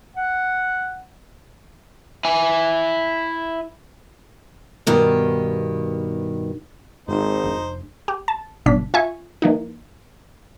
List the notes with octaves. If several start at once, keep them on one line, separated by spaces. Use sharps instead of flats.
F#5
E4 G#5
G2 B2 D#3 G4
G#1 G#2 D#4 C5
F1 A3 D4
G4
A5
G1 B2 D4 B6
F4 E5 G#5 C#6
E3 A#3 D#4